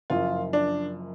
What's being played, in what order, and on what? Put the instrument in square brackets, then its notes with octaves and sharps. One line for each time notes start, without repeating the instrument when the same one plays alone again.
[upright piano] F#1 F#2 F3 [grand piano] F4
[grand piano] D4